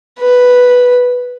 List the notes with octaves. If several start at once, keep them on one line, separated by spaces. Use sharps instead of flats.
B4